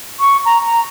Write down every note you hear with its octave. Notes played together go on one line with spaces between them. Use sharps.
C#6
A#5
A#5